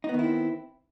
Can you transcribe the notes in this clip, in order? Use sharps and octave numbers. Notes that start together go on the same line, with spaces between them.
D#3 B3 C4 D#4 E4